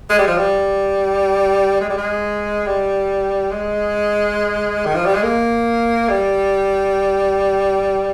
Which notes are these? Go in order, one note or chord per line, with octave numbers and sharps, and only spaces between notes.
G#3
G3
F3
G3
G#3
G3
G#3
G3
G#3
D#3
F3
G3
G#3
A#3
G3